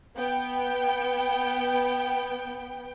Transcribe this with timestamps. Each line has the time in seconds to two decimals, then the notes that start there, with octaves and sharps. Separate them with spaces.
0.16 B3 G5